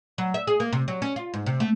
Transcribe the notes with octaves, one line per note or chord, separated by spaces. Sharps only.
F#3
E5
G#4
A#3
C3
F#3
C#4
F4
G#2
C3
A3